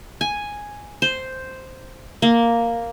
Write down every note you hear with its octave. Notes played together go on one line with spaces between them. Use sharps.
G#5
C5
A#3